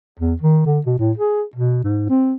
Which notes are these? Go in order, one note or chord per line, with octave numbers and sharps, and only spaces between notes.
E2
D#3
D3
B2
A2
G#4
B2
G#2
C4